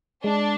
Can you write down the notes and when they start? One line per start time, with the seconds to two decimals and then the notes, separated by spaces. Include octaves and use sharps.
0.24 G#3 D4